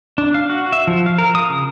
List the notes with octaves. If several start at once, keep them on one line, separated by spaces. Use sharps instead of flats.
D4
F5
F#4
E5
F3
F5
A#4
D#6
C#3